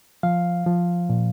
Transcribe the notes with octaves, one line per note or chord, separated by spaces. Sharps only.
F3 F5
F3
A#2